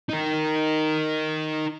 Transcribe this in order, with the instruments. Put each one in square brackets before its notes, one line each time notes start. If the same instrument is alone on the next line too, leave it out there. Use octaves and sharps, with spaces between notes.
[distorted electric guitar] D#4 A#4